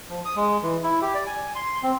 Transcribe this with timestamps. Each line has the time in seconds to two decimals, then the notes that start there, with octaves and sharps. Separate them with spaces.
0.10 F3
0.25 D#6
0.36 G#3
0.63 E3
0.83 E4
1.02 G4
1.14 D5
1.27 G#5
1.55 C6
1.83 C4